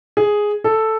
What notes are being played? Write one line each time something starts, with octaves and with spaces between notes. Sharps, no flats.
G#4
A4